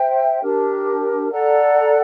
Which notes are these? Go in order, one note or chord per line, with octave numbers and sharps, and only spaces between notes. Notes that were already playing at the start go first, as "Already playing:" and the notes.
Already playing: C5 E5 G5
D4 G4 A#4
A4 D5 F#5 A#5